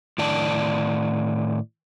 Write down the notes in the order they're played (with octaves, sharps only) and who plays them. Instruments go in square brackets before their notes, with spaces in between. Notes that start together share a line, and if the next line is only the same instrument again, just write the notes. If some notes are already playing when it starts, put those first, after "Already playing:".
[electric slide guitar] A2 D#3 D5 A5